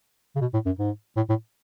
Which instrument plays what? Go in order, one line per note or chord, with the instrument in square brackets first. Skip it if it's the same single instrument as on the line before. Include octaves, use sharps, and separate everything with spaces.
[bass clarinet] C#3
B2
A2
F#2
G#2
A2
A2